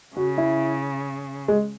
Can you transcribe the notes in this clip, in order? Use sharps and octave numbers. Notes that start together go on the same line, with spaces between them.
C#3 F#4
E4
G#3